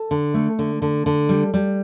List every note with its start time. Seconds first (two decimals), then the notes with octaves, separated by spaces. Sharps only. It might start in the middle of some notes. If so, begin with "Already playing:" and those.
Already playing: A4
0.11 D3
0.34 A3
0.59 D3
0.82 D3
1.06 D3
1.29 G3
1.54 G3